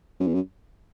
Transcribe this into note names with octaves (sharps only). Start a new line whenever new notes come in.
F#2
E2
F#2